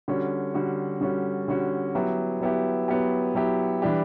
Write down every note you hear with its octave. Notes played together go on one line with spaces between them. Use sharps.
D3 G3 C#4 F#4
D3 G3 C#4 F#4
D3 G3 C#4 F#4
D3 G3 C#4 F#4
F#3 B3 E4 G4
F#3 B3 E4 G4
F#3 B3 E4 G4
F#3 B3 E4 G4
E3 G3 D4 G4